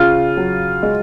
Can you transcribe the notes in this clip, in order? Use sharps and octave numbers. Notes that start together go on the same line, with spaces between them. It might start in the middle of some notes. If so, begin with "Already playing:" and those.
Already playing: C#3 F4
F#3
G#3